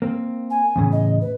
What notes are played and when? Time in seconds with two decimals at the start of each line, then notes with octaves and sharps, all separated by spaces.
0.02 A#3 C4
0.50 G#5
0.76 E2 A2 C#3
0.92 D#5
1.21 B4